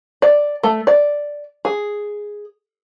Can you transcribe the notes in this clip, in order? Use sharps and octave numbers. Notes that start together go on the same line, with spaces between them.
D5
A3
D5
G#4